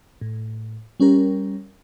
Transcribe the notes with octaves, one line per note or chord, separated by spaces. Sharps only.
A2
G3 C#4 G4 A#4